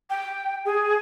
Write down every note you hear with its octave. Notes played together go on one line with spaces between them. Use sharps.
G5
G#4